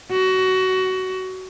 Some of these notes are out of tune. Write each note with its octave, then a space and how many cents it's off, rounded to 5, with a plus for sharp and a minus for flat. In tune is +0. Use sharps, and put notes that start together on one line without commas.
F#4 +20